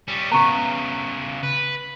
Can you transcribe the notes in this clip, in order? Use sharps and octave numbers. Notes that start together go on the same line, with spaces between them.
G3 C#4
C#3 B3 A#5 C#6
B4